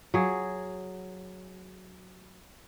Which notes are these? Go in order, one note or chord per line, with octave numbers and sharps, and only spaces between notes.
F#3 G#4